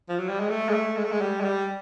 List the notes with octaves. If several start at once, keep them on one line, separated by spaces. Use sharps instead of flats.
F3
F#3
G3
G#3
A3
G#3
A3
G#3
A3
G#3
G3
G#3
G3